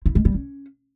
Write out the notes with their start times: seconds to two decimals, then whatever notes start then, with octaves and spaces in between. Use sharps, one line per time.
0.06 E4
0.15 G#3
0.25 G3
0.35 C#4